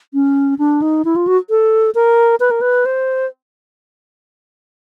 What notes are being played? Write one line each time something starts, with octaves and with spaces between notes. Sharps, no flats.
C#4
D4
D#4
E4
F4
F#4
A4
A#4
B4
A#4
B4
C5